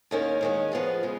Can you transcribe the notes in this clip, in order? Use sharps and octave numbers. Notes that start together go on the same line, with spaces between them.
D#2 D#3 A#3 C#4
D#2 D#3 G#3 C#4
F3 B3 F4 G#4
C#3 G#3